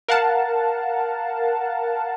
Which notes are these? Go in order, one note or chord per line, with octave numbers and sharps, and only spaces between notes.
A#4 F5 F#5 A5